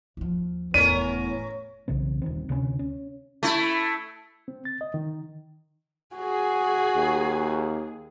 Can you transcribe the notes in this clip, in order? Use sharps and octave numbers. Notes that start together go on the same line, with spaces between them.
D#2 F3
F1 E2 A2 B3 C#4 A#4 D#7
B1 C#3 E3 C4
D#1 D#3 C4
D2 C3 G3 C#4
C#4
A3 E4
C4
A6
D#5
D#3
F#4 G#4 G#5
D#2